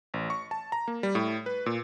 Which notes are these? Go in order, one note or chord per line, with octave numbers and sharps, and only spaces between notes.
A1
C#6
A5
A#5
A#3
G3
A2
B4
A#2